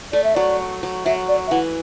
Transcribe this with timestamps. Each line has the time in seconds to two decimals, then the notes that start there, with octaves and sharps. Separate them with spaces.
0.13 A3 D5
0.24 E5
0.35 F#3 D5
0.83 F#3
1.05 F#3 E5
1.28 D5
1.47 E5
1.51 E3 F#5